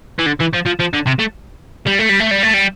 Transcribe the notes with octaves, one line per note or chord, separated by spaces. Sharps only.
E3
D3
E3
F3
F3
F3
D3
C3
A3
G3
A3
G3
A3
G3
A3
G3